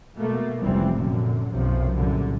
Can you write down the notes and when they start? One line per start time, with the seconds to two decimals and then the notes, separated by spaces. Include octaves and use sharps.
0.16 B2 A3 A#3
0.62 F1 C#2 E3 G3 C4
0.95 F#2 A#2 D3
1.53 B1 F#2 C3 F3
1.95 C2 F#2 A#2 D3